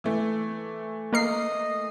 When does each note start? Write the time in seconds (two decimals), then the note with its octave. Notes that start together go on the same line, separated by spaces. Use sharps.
0.04 E3 A3
1.13 A#3 A#4 D#5 C7